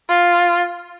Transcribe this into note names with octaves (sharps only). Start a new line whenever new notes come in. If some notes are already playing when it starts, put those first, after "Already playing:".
F4